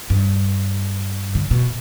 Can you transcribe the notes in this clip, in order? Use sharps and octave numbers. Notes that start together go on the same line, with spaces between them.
G2
D3
B2